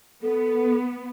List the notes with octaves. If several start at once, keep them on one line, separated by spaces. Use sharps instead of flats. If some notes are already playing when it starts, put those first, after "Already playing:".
B3 A4